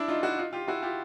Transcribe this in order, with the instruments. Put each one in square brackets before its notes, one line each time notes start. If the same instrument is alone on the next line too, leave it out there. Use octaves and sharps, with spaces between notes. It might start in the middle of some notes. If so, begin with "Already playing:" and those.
Already playing: [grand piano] D4 E4
D#4 F4
E4 F#4
D#4 F4
F4 G4
E4 F#4
F4 G4